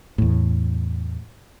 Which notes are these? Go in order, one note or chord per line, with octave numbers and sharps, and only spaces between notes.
E2 A2